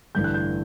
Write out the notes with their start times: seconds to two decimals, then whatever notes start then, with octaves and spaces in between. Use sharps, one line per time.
0.15 A1 G2 D3 G6
0.24 F#6
0.34 G6